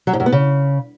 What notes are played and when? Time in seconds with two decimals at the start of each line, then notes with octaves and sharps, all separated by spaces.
0.07 F#3
0.13 G#2
0.20 F#2
0.26 B3
0.32 C#3